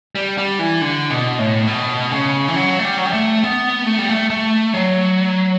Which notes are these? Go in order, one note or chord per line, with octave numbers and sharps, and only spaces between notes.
G3
G3
E3
D3
B2
A2
B2
C#3
E3
F#3
A3
G3
F#3
G3
A3
B3
A3
G3
A3
A3
F#3